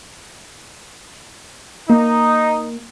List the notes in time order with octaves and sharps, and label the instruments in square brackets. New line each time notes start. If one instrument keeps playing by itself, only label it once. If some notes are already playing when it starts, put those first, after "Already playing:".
[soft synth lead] A#3 [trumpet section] D#4